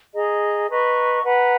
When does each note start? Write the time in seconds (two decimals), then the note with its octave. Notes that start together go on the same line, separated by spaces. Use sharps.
0.14 G#4 D#5 A#5
0.68 B4 D#5 A#5 C#6
1.23 B4 F#5 A#5